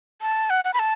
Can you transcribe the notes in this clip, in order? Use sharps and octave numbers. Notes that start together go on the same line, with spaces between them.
A5
F#5
F#5
B5
A5